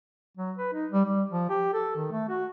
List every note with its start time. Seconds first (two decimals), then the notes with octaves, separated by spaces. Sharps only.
0.37 F#3
0.58 B4
0.73 D#4
0.92 G3
1.05 G3
1.30 F3
1.49 G4
1.74 A4
1.96 D#3
2.11 A3
2.29 F#4